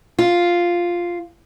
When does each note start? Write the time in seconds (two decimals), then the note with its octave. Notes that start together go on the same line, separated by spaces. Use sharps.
0.19 F4